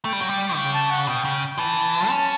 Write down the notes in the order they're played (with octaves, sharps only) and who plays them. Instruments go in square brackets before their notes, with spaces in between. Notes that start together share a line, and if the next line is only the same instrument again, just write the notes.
[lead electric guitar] A3 [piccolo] G5
[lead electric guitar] G3
F#3
G3
[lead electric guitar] C#3 [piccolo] G5
[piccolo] A5
F#5
[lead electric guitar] B2 [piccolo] G5
[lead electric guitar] C#3
[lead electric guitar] E3 [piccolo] A5
[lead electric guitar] C#4